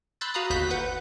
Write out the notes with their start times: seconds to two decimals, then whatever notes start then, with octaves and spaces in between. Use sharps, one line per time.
0.21 B5 C6 E6 F#6 G6 A6
0.34 F#4 F5 A#5 B5 D#6 F#6
0.50 G1 D#2 F#4 F#6 G6 B6
0.70 B4 F#5 G6